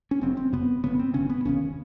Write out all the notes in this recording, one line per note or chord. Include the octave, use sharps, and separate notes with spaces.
C#4
F#1 F#2 C#3 C4
C4
F#1 F#2 C#3 B3
G1 F#2 C#3 B3
C4
G1 F#2 C#3 C#4
B3
E1 D#2 C#3 C#4